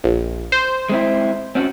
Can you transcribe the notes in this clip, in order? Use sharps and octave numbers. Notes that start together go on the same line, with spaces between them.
A#1
C5
G#3 C4 E4
C4 C#4 F#4